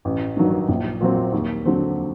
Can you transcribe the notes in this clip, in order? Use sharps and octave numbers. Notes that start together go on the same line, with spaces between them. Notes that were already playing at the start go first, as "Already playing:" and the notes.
A1
G2 D#3 F#3
A#1
A#2 F#3 C4
D#2
D3 F#3 C4